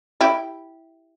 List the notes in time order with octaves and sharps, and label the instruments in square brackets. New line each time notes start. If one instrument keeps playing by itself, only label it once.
[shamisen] E4 G4